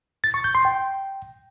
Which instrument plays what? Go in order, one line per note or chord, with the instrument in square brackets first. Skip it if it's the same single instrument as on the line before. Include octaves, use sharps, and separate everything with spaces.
[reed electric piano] A6
C#6
G6
C6
G5